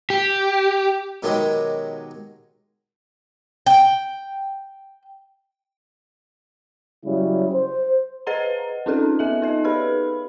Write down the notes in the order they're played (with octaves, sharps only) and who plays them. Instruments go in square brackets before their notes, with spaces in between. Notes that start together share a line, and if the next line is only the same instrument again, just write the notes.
[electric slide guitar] G4
[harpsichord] B2 D#3 F#3 G#3 G4
[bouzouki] G5
[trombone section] C#3 F#3 G3 E4
C5
[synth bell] G#4 B4 C5 D#5 F#5 A#5
C4 C#4 D#4 F4 G#4 A4
B3 A4 E5 F#7
D#4 A4 D#5
G4 G#4 B4 B5